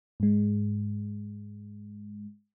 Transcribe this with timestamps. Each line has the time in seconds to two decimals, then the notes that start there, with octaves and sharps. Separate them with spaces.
0.20 G#2 G#3